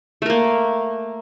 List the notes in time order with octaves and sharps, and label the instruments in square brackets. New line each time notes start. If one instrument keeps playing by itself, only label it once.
[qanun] A3
A#4
A#3